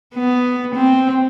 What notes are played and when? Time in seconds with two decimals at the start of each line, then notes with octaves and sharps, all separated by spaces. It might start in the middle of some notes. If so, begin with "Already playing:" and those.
0.15 B3
0.75 C4